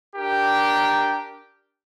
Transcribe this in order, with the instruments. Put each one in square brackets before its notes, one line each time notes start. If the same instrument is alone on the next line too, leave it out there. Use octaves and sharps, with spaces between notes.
[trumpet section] D4 G4 A#4